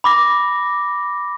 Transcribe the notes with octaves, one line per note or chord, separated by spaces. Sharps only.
B5 D6 A#6